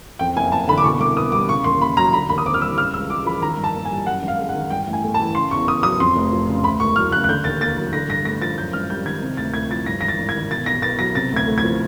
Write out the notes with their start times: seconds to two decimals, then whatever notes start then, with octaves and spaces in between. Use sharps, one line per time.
0.19 F2 G5
0.36 F#1 G#5
0.52 F#1 A5
0.68 D3 B5
0.78 D6
0.84 B2 C#6
1.00 C2 D6
1.16 B3 D#6
1.32 G3 D6
1.49 C#3 C#6
1.64 D#2 C6
1.81 A#3 B5
1.97 F#3 A#5
2.13 D3 B5
2.29 D#2 B5
2.38 D#6
2.45 C4 D6
2.54 F6
2.61 G3 E6
2.77 C#3 F6
2.94 C#2 E6
3.10 G#3 D6
3.25 F3 B5
3.42 D#3 A#5
3.58 G2
3.64 A5
3.75 A#3
3.85 G#5
3.91 G3
4.07 F#2 F#5
4.22 G#1
4.28 F5
4.39 G#3
4.49 F#5
4.55 D#3
4.70 G2 G5
4.87 A1
4.93 G#5
5.03 A3
5.14 A5
5.20 E3
5.35 C#3 C6
5.51 E2 C#6
5.67 E2 D#6
5.83 F#3 D#6
6.00 F2 C6
6.16 F1
6.32 F3
6.49 C#3
6.64 D2 B5
6.80 E1 C#6
6.96 F#3 F6
7.12 C#3 F#6
7.24 F#6
7.29 D3 G6
7.44 D#2 A6
7.61 A#3 A6
7.78 F#3
7.93 D3 A#6
8.09 G2 A#6
8.25 A3 A#6
8.42 F3 A6
8.58 F#2 G6
8.73 G#1 F6
8.90 G3 G6
9.06 D#3 G#6
9.22 C3
9.37 D2 A6
9.54 D2 G#6
9.71 F3 A6
9.86 G2 A#6
10.01 G#1 A#6
10.08 A6
10.19 G#1
10.29 G#6
10.35 D#3
10.51 B2 A6
10.66 B1 A#6
10.82 B3 A6
10.99 F#3 A#6
11.15 C3 A6
11.32 D2 G#6
11.47 A3
11.58 G#6
11.64 F3